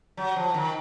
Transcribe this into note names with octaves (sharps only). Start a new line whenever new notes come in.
F#3
F3
D#3